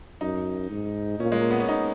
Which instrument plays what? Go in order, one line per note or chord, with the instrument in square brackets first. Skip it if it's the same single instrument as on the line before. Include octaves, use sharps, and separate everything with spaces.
[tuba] F#2 [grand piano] D#4
[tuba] G#2
[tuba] A#2 [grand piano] C#4
[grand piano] G#3
A#3
B3
C#4
D#4